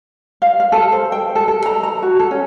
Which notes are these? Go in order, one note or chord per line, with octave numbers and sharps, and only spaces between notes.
F5
F5
A4
C5
G5
A4
A4
A#5
A#5
F#4
A4
C#4